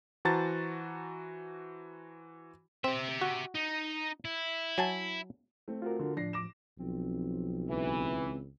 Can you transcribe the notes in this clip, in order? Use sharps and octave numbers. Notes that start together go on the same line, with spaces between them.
E3 F#4 C5 A5 A#5 A6
C4 G4 E5
F#4
D#4
E4
F#3 G#5 A5
A3 C4
F4 F#4 A#4
D3
A2 F3 D4 A#6 C7
D6 A#6 E7
B1 F3 C4
C#2 E3